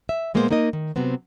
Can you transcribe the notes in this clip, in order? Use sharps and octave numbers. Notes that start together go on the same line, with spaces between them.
E5
A#2 G#3 A#3 B3 E4 C5
A#3 D#4 A#4 D#5
D#3
C3 F#3 B3 C4